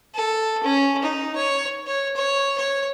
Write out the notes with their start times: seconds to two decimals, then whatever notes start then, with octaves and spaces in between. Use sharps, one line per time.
0.15 A4
0.63 C#4
1.03 D#4
1.35 C#5
1.87 C#5
2.16 C#5
2.58 C#5